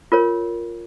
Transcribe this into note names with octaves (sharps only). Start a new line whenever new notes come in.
F4 A#4 C#5